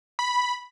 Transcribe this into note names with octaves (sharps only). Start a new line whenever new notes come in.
B5